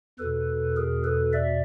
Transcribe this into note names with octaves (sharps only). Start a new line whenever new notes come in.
E2 B2 A4 B4
G#4 A#4
A4 B4
D5 E5